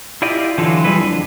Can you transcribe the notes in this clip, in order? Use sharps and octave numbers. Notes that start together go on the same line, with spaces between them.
E4 F4 G4 D5 D#5
D3 E3 F#3 F4 A4
E3 G3 G#4 A4 B4
F2 D4 A4